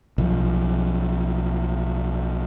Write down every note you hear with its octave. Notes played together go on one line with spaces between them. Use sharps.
B1 F3